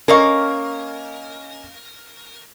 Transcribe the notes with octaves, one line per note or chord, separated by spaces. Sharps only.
A#3 C#4 A#4 D#5 F5 C#6